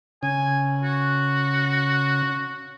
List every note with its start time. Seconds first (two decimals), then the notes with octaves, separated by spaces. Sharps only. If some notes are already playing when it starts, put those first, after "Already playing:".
0.23 C#3 G#5
0.83 F#4